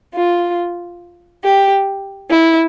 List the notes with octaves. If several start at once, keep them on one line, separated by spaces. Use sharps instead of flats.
F4
G4
E4